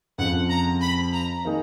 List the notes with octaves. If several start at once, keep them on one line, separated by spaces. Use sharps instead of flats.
F2 C#3 F3 F#5
A#5
B5
A#5
D#3 A#3 D#4 G#4